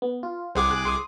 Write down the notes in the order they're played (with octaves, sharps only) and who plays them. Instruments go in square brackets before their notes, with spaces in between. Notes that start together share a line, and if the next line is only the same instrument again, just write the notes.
[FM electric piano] B3
F4
[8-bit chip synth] C2 G#4 D6 [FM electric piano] C5 F#5
[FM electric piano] F#6
C6 D#6